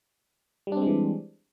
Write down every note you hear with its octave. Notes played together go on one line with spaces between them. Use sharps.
E3 G3 G#3 C4 D4